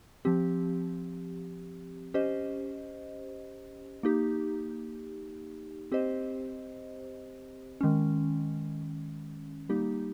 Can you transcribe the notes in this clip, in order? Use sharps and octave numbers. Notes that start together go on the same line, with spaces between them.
F3 C4 G4
C#4 G4 C5 D#5
A#3 D#4 G4
C4 G4 C5 D#5
D#3 G#3 C#4
G3 A#3 D#4 G4